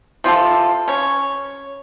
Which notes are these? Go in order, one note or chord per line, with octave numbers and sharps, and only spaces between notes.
C3 F4 G4 A4
C#4 C#5